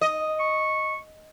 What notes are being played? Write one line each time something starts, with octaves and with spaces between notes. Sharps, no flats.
D#5
C#6